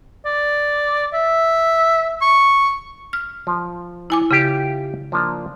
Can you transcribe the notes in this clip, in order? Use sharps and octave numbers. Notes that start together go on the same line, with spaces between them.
D5
E5
C#6
F6
F3
E4 G#5 D6
C#3 F4 G4 E5
F3 A#3 D4